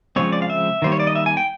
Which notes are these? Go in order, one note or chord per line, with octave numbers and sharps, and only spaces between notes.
C#3 F3 G#3 C4 C#5
D5
F5
E5
D#3 G3 A#3 C5
C#5
D5
D#5
E5
G#5
G5